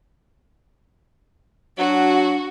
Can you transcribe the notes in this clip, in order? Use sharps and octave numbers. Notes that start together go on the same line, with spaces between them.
F#3 D4 F#4 F#5